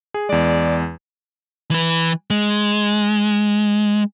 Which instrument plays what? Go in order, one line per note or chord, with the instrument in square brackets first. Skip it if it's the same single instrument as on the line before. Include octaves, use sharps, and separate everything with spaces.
[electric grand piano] G#4
[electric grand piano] E2 G#3 [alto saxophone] D5
[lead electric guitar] E3 B4
G#3